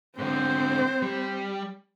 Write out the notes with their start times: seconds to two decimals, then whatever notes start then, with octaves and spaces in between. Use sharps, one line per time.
0.18 G#2 D3 C4 C5
1.02 G3